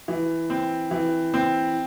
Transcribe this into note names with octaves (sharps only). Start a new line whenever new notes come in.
E3
C4
E3
C4